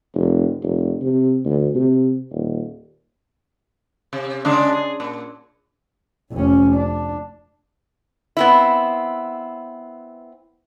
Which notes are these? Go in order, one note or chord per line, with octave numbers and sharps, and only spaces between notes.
F1
F1
C3
D2
C3
D#1
C3
C#3 G#3 D4
G#4
A#2
F1 C#4
D4
B3 C4 E4